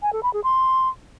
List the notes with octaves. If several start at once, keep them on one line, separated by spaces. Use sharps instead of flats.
G#5
A4
B5
G#4
C6